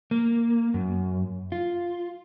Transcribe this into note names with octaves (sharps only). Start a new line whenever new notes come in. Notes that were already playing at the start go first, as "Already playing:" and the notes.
A#3
F#2
F4